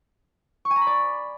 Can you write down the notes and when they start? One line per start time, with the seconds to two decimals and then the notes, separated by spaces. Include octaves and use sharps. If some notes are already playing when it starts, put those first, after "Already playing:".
0.65 C#6
0.71 G#5
0.76 A#5
0.81 B5
0.87 D5